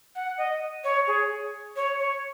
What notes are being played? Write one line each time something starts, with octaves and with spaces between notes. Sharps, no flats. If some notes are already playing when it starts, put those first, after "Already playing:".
F#5
D#5
C#5
G#4
C#5
C#5